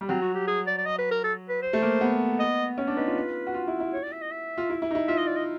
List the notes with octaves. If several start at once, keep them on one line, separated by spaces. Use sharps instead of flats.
G3
F#3 C4
F#4
G4
G#4
D5
D5
D#5
B4
A#4
A4
B4
C5
A3
A#3
B3
D#5
C#4
D4
D#4 B4
F4
F#4
F4
E4
E4
C#5
D5
E5
D#5
E5
F4
E4
E4
D#4
E4
F4 E5
D#5
D5
D#5